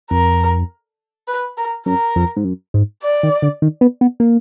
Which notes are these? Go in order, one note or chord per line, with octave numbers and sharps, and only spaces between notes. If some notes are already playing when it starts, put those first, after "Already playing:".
F2 A#4
B4
A#4
F#2 A#4
F2
G#2
F#2
G#2
D5
D#3
D3
D#3
B3
B3
A#3